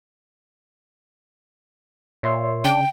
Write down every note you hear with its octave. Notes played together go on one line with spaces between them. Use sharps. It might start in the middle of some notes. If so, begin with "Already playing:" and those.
A#2 C#5 E5 C6
C#3 D4 G5